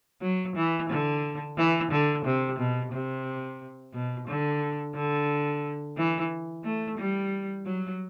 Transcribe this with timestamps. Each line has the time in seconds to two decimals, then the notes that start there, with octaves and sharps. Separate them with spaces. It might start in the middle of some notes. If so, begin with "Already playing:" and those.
0.22 F#3
0.56 E3
0.90 D3
1.57 E3
1.91 D3
2.25 C3
2.58 B2
2.92 C3
3.93 B2
4.28 D3
4.95 D3
5.97 E3
6.64 A3
6.98 G3
7.66 F#3